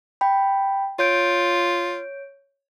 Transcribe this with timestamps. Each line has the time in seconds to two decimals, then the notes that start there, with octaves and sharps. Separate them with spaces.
0.21 G5 B5
0.99 F4 C#5 G6 D7